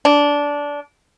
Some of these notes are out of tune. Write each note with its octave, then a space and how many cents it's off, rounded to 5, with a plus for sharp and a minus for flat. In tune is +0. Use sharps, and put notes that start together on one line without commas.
D4 -15